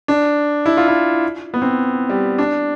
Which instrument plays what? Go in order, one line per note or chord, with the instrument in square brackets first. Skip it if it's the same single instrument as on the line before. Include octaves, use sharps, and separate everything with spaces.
[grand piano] D4
E4
F4
E4
B3
C4
G3
D4